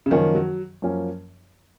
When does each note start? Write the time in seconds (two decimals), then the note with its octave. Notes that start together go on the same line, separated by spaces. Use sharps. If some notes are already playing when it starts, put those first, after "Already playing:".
0.06 C#3
0.10 F#2 D#3 F3 A#3 C#4
0.35 F#3
0.82 F#2 F3 A#3 C#4